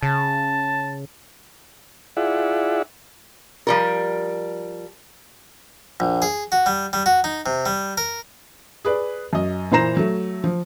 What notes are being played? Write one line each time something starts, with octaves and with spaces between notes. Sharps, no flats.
C#3 A5
E4 F4 G#4 D5 E5 F#5
F3 G3 A#4
A#1
G#4
F#4
G3
G3
F#4
D#4
C3
G3
A#4
G#4 B4 D5
F#2 D#5
A#2 E3 C5 A#5 A#6 E7
F#3 A3
F3